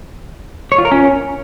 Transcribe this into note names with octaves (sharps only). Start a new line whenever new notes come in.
C#5
F4
A#4
C#4